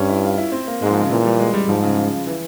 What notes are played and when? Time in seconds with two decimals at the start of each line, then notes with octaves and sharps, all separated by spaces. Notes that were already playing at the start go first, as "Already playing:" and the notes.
Already playing: G2 C#4
0.09 E4
0.23 F4
0.38 E4
0.52 C4
0.67 A#3
0.82 G#2 G#3
0.91 F3
1.01 C#3
1.10 A#2 E3
1.24 G3
1.39 G#3
1.54 G3
1.68 G#2 F3
1.83 C#3
2.27 E3